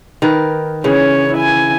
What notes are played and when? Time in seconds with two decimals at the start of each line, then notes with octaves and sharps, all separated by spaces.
0.22 D#3 A#4 B4
0.84 C#3 E3 C#4 C#5
1.33 E4 G#5